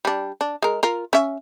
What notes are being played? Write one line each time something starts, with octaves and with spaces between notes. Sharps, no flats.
G3 D4
D4
G#3 A#4
F4 A#4
C#4 E5